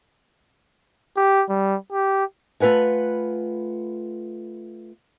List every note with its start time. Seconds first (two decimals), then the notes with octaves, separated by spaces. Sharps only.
1.17 G4
1.49 G3
1.92 G4
2.60 A3 F4 B4 F#5 G#5